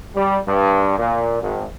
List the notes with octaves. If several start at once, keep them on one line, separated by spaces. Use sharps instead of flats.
G3
G2
A#2
G#1